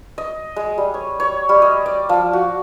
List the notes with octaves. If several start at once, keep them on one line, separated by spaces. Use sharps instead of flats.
D#5
G#3
G3
C#5
C#5
G3
D#5
D5
F3
F#4